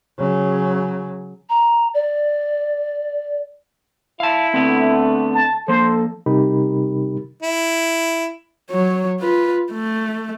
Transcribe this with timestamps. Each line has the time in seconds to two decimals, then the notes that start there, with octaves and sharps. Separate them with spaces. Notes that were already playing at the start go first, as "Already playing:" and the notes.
0.18 C#3 F#3
1.49 A#5
1.94 D5
4.20 E4 F5 A5
4.54 D3 A3 B3 C4
5.35 A5
5.68 F3 A#3 A4 C5
6.26 C3 G3 D#4 G4 A#4 B5
7.42 E4
8.70 F#3 C#5
9.20 F4 B4
9.72 A3